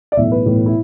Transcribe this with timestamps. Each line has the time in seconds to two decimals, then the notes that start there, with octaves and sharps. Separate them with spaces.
0.12 D5
0.17 B1 A2 E3 E5
0.32 B4
0.46 B1 A2 E3
0.66 E4